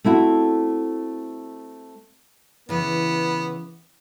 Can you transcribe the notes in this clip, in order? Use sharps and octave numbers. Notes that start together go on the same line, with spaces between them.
A3 C4 E4 F#4
C#3 E3 B3